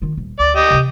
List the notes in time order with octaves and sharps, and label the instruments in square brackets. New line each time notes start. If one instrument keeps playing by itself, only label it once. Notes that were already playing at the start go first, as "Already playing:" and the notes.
[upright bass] D#3 F4
D#1
[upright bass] D2 [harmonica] D5
[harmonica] G4 D#5
[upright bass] C3 E3